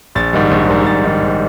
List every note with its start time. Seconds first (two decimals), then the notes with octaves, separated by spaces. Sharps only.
0.15 A#1 A6
0.33 G#2 D#3 G3
0.51 A#1
0.68 G#2 D#3 G3
0.86 A#1 A6
1.04 G#2 D#3 G3
1.22 A#1